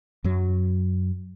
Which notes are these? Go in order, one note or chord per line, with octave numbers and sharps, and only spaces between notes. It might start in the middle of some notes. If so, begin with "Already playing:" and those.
F#2 F#3